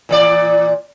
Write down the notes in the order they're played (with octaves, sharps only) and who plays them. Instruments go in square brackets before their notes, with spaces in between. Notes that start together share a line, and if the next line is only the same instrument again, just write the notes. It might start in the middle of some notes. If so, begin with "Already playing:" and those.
[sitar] A#2 E3 D5